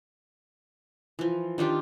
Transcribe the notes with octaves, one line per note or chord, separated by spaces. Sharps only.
E3 F3
D#3 D4 F4 G4